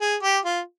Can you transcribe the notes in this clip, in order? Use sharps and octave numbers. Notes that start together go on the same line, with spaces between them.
G#4
G4
F4